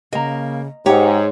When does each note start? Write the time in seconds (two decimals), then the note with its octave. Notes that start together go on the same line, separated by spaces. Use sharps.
0.13 C#3 A#3 D#5 A#5
0.86 G#2 G#3 G4 C#5 F#5 A#5